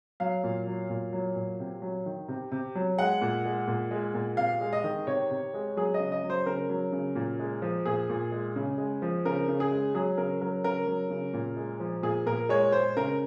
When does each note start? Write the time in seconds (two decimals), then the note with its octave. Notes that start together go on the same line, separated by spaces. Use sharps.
0.20 F#3 F5
0.44 A#2
0.67 F#3
0.90 A#2
1.13 F#3
1.36 A#2
1.60 C3
1.82 F#3
2.06 D#3
2.28 C3
2.52 C3
2.75 F#3
2.98 G#3 F#5
3.21 A#2
3.46 G#3
3.68 A#2
3.91 G#3
4.14 A#2
4.37 C3 F5
4.61 G#3
4.73 D#5
4.84 D#3
5.07 C3 C#5
5.31 C3
5.54 G#3
5.77 F#3 G#4
5.94 D#5
6.00 C#3
6.12 D#5
6.23 F#3
6.30 C5
6.46 C#3 A#4
6.69 F#3
6.92 C#3
7.16 A#2
7.39 G#3
7.62 F3
7.85 A#2 G#4
8.10 A#2
8.32 G#3
8.56 C#3
8.78 G#3
9.02 F3
9.25 C#3 A#4
9.48 C#3
9.60 G#4
9.71 G#3
9.94 F#3 G#4
10.17 C#3 A#4
10.41 F#3 A#4
10.64 C#3 A#4
10.87 F#3
11.10 C#3
11.34 A#2
11.56 G#3
11.80 F3
12.03 A#2 G#4
12.26 A#2 A#4
12.49 G#3 C#5
12.72 G#3 C5
12.97 C#3 A#4